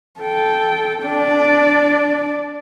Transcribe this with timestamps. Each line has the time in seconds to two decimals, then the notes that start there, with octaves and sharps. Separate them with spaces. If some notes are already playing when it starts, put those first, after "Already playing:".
0.20 A4 G5
1.03 D4 D5